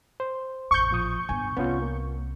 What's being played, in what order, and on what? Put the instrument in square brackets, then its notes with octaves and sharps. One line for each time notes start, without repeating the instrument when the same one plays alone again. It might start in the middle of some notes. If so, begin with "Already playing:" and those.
[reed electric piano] C5
[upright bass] A1 F2 [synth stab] C#6 G6
[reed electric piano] A#2 F3 D#6
[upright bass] G2 B3 [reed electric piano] G#5
[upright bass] C2 [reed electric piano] B3 C#4 F4
[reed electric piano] A#3